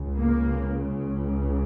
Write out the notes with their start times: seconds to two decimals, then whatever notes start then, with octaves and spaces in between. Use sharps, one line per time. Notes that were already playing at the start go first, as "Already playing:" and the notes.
Already playing: C#2 C#3
0.16 A#3